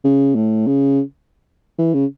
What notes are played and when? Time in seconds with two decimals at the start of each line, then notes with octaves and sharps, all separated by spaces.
0.04 C#3
0.35 A2
0.68 C#3
1.78 E3
1.94 C#3